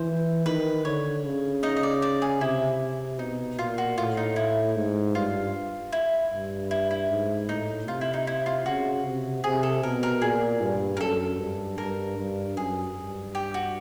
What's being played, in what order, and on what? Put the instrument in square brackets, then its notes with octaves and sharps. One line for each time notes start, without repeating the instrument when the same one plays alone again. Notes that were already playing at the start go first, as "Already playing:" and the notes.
Already playing: [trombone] E3 [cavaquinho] C5
[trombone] D#3 [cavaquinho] B4
[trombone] D3 [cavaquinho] C#5
[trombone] C#3
[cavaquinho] D#4 D#5
D#5
D5
D5
G#4
[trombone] C3 [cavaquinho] E4
[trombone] B2 [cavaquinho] D#4
[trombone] A#2 [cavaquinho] F4
[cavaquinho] F#4
[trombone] A2 [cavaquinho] F4
[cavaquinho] D#4
E4
[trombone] G#2
[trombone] G2 [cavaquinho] F4
[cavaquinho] E4
[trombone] G2
[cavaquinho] E4
E4
[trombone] G#2
[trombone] A2 [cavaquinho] D#4
[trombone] C3 [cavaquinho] F4
[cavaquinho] E4
D#4
E4
F4
[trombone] C#3 [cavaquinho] F#4
[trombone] C3
[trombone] C3 [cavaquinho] G#4
[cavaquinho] A4
[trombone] B2 [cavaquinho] A#4
[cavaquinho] A#4
[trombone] A#2 [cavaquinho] G#4
[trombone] G2
[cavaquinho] A#4
[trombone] F#2 [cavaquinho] A4
[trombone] G2
[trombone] G2 [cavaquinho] A#4
[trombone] G2
[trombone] F#2 [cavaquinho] G#4
[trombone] G2
[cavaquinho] G4
F#4